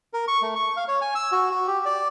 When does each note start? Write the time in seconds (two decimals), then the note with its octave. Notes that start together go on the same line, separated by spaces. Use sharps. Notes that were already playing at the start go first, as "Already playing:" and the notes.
0.13 A#4
0.28 C#6
0.42 A3
0.56 C#6
0.77 F5
0.88 C#5
1.02 G#5
1.15 E6
1.32 F#4
1.51 F#4
1.67 G4
1.85 D5